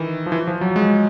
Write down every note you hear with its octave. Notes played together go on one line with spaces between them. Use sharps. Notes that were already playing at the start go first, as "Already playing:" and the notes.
Already playing: D#3 E3
F3
E3
F3
F#3
G#3